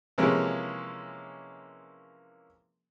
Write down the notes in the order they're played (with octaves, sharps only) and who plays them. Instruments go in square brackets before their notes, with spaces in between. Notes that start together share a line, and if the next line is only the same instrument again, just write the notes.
[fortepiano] C3 E3 F3 G#3 A#3 C#4